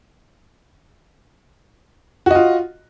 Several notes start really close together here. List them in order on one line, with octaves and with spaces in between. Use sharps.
F#4 D#5 F4